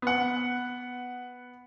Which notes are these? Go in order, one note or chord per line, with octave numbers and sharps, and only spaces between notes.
B3 F#5